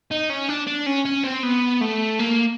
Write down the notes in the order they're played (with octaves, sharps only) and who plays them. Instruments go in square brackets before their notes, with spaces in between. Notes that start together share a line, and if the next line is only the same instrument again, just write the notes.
[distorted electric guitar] D#4
C#4
D4
D4
C#4
C#4
C4
B3
A3
A#3